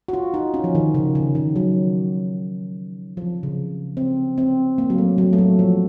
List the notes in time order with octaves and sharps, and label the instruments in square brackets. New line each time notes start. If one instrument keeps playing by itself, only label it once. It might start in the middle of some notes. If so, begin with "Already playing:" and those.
[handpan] F#4
F4
D#4
C#4
F3
D#3
C#3
C#3
D#3
F#3
F3
C#3
C4
C4
A#3
F#3
A3
F#3
A3
F#3
F3